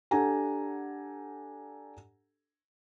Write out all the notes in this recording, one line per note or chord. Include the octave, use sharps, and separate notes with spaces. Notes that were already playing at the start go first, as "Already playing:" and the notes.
D4 G4 A4 F#5 G#5 A#5